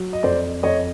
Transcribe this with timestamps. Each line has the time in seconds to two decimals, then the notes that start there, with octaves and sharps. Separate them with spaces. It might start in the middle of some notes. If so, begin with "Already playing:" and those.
Already playing: F#3
0.13 D#5
0.23 F2 C5 D5
0.63 F2 C#5 D#5